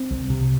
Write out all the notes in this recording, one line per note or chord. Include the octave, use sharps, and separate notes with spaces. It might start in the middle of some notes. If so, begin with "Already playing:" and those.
Already playing: C4
C2
C3